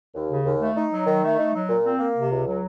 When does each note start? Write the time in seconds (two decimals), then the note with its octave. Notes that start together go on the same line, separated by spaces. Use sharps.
0.15 D#2
0.29 C#3
0.45 D#2
0.60 A3
0.76 D#4
0.92 F#3
1.06 D#3
1.23 A3
1.38 D#4
1.54 F#3
1.69 A#2
1.84 C4
1.99 A#3
2.15 C3
2.30 C#2
2.46 F#3